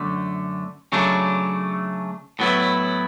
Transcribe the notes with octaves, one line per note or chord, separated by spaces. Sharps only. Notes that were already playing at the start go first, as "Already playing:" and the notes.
Already playing: F#2 D3 A3
C#3 F#3 A3 D4
A2 F#3 B3 E4